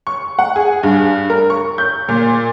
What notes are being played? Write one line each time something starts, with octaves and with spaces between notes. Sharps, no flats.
C#6
F#5
G#4
G2
A#4
C#6
G6
A#2